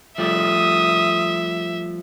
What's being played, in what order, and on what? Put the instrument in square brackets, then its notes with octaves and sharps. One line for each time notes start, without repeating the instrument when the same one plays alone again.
[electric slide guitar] F3 G3 A3 [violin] E5 [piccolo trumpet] D#6